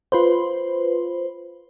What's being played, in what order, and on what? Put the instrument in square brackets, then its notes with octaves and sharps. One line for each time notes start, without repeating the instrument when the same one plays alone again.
[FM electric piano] F4 B4 C5